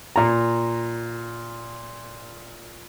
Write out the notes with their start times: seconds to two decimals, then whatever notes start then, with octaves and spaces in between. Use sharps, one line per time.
0.16 A#2 A#5